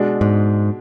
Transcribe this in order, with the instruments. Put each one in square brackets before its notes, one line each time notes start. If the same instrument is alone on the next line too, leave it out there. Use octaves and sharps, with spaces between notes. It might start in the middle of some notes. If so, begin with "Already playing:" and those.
Already playing: [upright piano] B2 G#3 D4
[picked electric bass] G#2